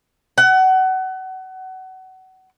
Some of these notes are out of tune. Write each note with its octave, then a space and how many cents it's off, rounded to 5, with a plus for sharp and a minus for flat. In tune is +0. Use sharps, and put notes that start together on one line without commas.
F#5 +25